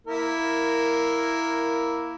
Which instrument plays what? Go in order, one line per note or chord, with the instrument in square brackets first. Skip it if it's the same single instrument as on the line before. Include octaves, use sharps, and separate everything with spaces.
[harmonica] A#3 E4 A#4